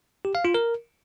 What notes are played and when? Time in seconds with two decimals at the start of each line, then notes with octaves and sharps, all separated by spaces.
0.25 G4
0.35 F5
0.45 F4
0.54 A#4